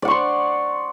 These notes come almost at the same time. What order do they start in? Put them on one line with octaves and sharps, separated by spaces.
D5 F#5 C#6 C6